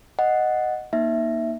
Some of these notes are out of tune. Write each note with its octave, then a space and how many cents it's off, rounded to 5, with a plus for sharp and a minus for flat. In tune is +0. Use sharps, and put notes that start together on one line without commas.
D#5 -5 F#5 +0
A#3 +15 D#4 +0 E5 +0